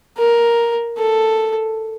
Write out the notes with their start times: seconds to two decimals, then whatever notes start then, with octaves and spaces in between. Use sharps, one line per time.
0.18 A#4
0.98 A4